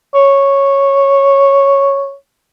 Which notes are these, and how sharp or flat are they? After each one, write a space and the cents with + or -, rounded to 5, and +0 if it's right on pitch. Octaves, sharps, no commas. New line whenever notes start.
C#5 -5